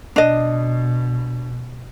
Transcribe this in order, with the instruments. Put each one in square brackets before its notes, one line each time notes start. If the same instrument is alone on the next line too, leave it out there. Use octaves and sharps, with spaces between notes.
[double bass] B2 [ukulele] D4 D#5